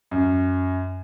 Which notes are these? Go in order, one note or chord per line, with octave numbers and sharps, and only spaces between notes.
F#2